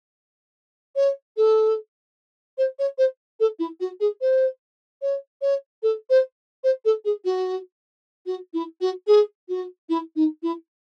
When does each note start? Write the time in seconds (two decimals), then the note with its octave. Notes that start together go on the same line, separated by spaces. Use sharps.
0.96 C#5
1.37 A4
2.58 C5
2.79 C#5
2.98 C5
3.40 A4
3.59 E4
3.80 F#4
4.00 G#4
4.21 C5
5.02 C#5
5.42 C#5
5.82 A4
6.10 C5
6.64 C5
6.85 A4
7.05 G#4
7.25 F#4
8.26 F#4
8.54 E4
8.81 F#4
9.07 G#4
9.48 F#4
9.89 E4
10.16 D#4
10.43 E4